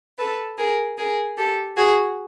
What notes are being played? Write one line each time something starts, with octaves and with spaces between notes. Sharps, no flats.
A4 B4
G#4 A#4
G#4 A#4
G4 A4
F#4 G#4